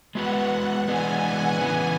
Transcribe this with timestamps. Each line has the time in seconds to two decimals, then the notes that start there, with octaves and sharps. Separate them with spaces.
0.15 G#3 B3 F#4 B4 F#5
0.51 F#5
0.88 E3 G#3 B3 D4 G#5
1.25 F#5
1.61 C#3 E3 B3 G#5